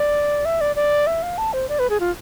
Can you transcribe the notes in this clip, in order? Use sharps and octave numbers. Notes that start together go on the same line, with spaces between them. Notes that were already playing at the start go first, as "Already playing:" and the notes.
Already playing: D5
E5
D5
D5
E5
F5
A5
C5
D5
B4
G#4
F4